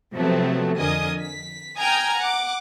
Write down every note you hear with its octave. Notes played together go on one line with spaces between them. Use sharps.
C3 F3 F#3 A3 B3 C4
F2 D3 A#4 D#5 G#5 D#6
B6
G5 G#5 A#5 D#6 F6 G#6
F#5 D6